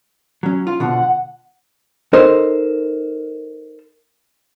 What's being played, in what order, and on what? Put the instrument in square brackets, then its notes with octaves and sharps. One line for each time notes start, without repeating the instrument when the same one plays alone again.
[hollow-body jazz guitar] F#3 C#4
F4
[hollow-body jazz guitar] B2 D3 F3 [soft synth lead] F#5
[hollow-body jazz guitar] D#4 A4 A#4 C5